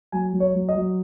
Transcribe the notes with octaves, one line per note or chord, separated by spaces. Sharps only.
F#3 G#5
F#3
C#5
F#3
D#5
F#3